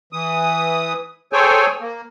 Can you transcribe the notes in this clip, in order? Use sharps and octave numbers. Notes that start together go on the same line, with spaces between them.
E3 D#6
G#4 A4 C5 C#5 G5 G#5
A#3